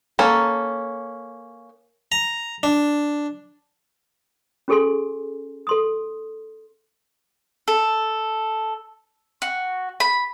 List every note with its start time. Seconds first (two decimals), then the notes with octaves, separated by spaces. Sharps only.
0.19 A#3 C#4 A4
2.12 A#5
2.63 D4
4.68 C#4 F#4 G#4 A4 G#5 C6
5.67 A4 C6 D#6
7.68 A4
9.42 F#4
10.00 B5